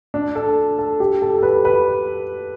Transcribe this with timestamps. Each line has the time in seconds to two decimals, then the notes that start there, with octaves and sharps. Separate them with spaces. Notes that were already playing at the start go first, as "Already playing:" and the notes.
0.14 D4
0.35 A4
0.79 A4
1.00 G4
1.22 A4
1.38 A4
1.43 B4
1.65 B4